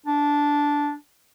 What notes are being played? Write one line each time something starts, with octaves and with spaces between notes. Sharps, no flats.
D4